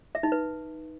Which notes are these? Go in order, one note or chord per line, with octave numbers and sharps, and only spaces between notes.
E5
D#4
B4